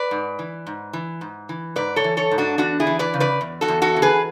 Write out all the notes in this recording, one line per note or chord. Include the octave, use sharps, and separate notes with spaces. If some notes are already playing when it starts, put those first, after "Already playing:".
Already playing: B4 D5
G#2
E3
G#2
E3
G#2
E3
G#2 B4 D5
A4 C#5
E3
A4 C#5
G#2
D4 F#4
E2 D4 F#4
E4 G#4
E3
B4 D5
C#3
B4 D5
E2
F#4 A4
E2
F#4 A4
E3
G#4 B4